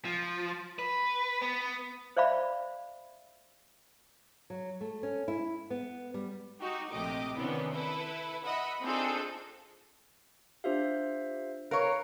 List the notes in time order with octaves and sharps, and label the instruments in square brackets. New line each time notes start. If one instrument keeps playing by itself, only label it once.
[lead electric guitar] F3
B4
B3
[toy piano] C5 D5 E5 F5 B5
[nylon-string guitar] F#3
A3
C#4
E4
B3
G3
[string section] D#4 F#4 G4
A#1 C3 A3 G4 D#5 D6
C3 D#3 E3 B3 C#4 D4
E4 A4 B4
D#5 E5 F#5 B5
C4 D4 D#4 F4 G#4 A4
[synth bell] D4 F4 G4 [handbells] C5 E5 F5
[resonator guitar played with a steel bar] A#4 C#5 [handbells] B4 F5